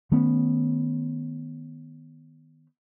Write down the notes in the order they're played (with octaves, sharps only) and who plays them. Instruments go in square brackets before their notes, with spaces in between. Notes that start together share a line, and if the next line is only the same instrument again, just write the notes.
[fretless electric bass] D#3 A3 B3 C#4